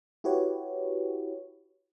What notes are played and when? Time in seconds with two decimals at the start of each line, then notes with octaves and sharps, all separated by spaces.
0.24 E4 F#4 G4 B4 C#5